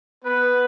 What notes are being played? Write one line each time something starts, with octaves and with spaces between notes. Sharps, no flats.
B3 B4